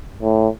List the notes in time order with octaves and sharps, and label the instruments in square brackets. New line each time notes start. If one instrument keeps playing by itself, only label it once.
[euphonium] A2